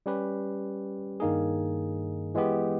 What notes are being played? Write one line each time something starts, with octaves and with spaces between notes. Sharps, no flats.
G3 C#4 G4 B4
G2 D#3 A#3 D#4 G#4
E3 G#3 B3 G4